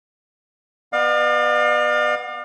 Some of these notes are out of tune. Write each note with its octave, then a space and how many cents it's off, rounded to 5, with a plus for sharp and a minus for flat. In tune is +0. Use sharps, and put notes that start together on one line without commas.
B3 +0 D5 +45 F5 +30